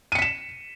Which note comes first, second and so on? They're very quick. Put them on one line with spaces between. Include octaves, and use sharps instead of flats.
D#7 C#7 B6 E7